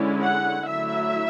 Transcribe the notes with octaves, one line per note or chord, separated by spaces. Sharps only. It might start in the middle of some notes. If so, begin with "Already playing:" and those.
Already playing: D3 G#3 C#4 E4
F#5
D3 F#3 A3 E4 E5